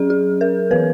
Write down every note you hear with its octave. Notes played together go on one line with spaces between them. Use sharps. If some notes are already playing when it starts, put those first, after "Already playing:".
Already playing: F#3 C#4 G#4
G#4
A#4
E3 B3 B4